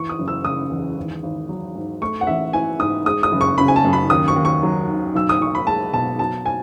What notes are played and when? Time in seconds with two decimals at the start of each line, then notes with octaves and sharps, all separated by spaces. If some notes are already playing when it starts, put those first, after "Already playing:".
Already playing: E3 C#6
0.09 D#6
0.19 F#1
0.28 E6
0.45 C#3 D#6
0.71 E2
0.97 G#1
1.23 G#1
1.49 F#3
1.75 G#2
2.01 A3 C#6
2.21 F#5
2.27 A1 E5
2.53 E3 G#5
2.79 G#2 D#6
3.06 G#3 D#6
3.23 D#6
3.32 F#1
3.41 C#6
3.58 C#3 B5
3.68 G#5
3.76 A5
3.84 F#2
3.93 B5
4.10 D#2 D#6
4.28 C#6
4.36 D#2
4.45 C#6
4.63 F#3
4.89 D#3
5.15 B1 E6
5.29 D#6
5.41 B1 C#6
5.55 B5
5.67 G#3 A5
5.93 B2 A5
6.19 F#3 A5
6.46 G#5